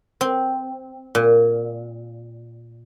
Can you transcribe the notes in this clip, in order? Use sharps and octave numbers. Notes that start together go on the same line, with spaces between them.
C4
A#2